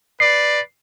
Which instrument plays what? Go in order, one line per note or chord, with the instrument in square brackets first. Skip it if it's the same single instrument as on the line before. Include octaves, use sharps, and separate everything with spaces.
[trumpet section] B4 D5 [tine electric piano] C7